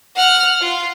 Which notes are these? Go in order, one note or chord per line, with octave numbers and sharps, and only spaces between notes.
F#5 F6
F4